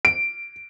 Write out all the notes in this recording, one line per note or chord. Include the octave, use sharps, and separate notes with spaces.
D7